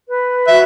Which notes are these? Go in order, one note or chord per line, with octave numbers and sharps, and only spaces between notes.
B4
F#4 E5